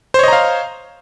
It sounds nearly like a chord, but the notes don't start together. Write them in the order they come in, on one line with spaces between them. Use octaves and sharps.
C5 C#5 D#5 A#5 F5